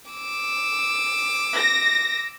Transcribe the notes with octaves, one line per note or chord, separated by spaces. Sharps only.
D6 E6
A#6